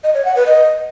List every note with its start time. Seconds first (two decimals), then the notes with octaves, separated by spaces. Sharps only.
0.04 D#5
0.14 C#5
0.25 F#5
0.36 B4
0.46 D#5